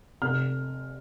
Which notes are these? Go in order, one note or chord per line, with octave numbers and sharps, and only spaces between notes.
F1 F6